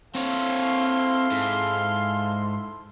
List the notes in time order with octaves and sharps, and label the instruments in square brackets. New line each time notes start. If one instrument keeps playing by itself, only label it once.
[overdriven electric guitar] C4 C#5 [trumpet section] E4 A4 C6 [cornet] F5
[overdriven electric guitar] G#2